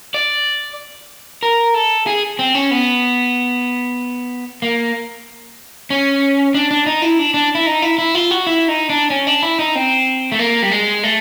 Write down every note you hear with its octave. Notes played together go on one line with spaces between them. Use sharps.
D5
A#4
A4
G#4
C4
C#4
B3
A#3
C#4
D4
D4
D#4
E4
D4
D4
E4
D#4
E4
E4
F4
F#4
E4
D#4
D4
C#4
D4
E4
D#4
C4
A3
A#3
G3
G#3
A3